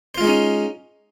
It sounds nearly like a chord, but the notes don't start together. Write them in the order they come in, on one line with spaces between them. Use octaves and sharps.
C5 F4 G#3 D#4 C#4